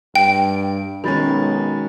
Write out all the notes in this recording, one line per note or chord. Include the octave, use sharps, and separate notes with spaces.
G2 G5
B1 D#3 G#3 C#4 F#4 B5 A6